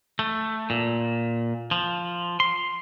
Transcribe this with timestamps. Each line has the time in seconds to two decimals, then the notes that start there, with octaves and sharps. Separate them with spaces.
0.19 A3
0.70 A#2
1.71 F3
2.40 C6